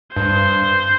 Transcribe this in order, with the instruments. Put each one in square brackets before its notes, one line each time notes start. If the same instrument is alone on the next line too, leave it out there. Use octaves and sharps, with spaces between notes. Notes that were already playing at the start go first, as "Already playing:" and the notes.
[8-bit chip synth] G2 [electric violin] C5